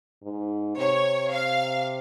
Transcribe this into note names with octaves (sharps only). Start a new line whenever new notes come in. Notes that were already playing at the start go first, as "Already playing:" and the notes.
G#2
C3 C#5
F5